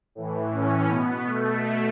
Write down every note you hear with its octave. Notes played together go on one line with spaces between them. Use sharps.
A2 E3
A2 E3 C#4
B2 B3
B2 A3